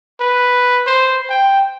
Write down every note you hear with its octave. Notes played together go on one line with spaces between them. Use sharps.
B4
C5
G5